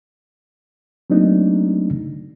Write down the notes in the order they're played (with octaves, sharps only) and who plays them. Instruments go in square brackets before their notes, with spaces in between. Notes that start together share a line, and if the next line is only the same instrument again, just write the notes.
[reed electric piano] F#3 A3 A#3 C4 D4 D#4